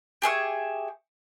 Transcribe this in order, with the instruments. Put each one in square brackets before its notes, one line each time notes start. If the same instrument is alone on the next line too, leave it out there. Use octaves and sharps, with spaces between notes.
[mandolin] G4 G#4 E5 C#6